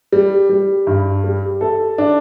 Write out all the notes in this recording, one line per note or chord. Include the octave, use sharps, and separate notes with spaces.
G3
G3
G2
G3
A4
D4